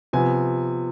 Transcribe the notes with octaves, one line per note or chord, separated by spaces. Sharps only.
C3 F3 B3 G#5